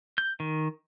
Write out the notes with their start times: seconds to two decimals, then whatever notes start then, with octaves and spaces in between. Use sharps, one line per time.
0.18 G6
0.40 D#3